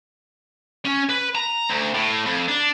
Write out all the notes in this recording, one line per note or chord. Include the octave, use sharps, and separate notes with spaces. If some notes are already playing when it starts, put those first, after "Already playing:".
C#4
B4
A#5
D2
A2
F2
D4